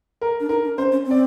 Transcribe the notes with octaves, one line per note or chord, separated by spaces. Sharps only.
A#4
D4
D#4 A#4
D4
C#4 C5
C#4
C4
D5